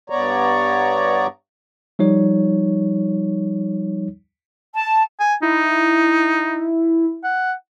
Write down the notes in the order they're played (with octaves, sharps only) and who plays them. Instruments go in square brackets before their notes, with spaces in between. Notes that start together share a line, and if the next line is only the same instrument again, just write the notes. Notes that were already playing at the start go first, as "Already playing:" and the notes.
[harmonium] G2 B3 C#5 D5 A#5
[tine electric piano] F3 G3 D#4 C#5
[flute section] A5
[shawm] G#5
[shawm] D#4 [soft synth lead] E4
[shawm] F#5